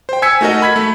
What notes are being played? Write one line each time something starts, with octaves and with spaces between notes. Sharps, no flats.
C5 G5
G#5 E6 G#6 B6 C#7
A3 D#4 F#4 A4 A#4 D#5
B5 G#6 B6
A3